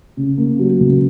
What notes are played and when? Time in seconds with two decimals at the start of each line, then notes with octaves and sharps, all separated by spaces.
0.17 C#3
0.38 A#3
0.59 F#3
0.80 C#2